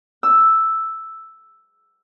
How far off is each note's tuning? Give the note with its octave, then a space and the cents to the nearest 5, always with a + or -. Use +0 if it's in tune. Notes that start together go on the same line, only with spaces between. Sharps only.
E6 +0